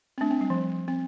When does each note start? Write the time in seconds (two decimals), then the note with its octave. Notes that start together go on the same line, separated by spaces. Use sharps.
0.18 C4
0.21 A3 D4
0.31 C4
0.41 G3
0.50 F3
0.88 C4